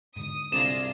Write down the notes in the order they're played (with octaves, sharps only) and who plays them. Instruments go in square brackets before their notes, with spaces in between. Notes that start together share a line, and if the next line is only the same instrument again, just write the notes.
[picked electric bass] G#2 D3 [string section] D#6
[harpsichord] C2 D4 A#5 [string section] F4 G#4 [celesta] E7